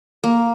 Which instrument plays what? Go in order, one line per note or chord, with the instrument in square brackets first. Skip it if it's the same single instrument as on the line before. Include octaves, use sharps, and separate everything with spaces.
[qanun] A#3